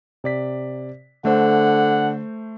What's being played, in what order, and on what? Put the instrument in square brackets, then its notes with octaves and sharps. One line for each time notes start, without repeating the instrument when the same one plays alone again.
[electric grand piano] C3 D5 B6
[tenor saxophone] D3 [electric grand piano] A3 C5 [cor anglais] F#5